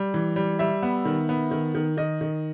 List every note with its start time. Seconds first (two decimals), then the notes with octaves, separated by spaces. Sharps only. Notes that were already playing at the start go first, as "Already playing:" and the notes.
Already playing: G3
0.14 E3
0.36 G3
0.59 G3 E5
0.83 B3
1.05 D#3
1.29 B3
1.51 D#3
1.75 D#3
1.97 D#3 D#5
2.21 D#3